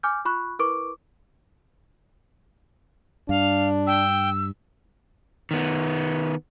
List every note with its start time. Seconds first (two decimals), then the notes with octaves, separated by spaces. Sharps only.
0.03 G#5 D6 F6 G6
0.25 F4 B5 C#6 F#6
0.59 E4 A#4 B4 C#6 D6 D7
3.29 G2 D4 F5
3.87 G5 E6
5.51 D#3 B3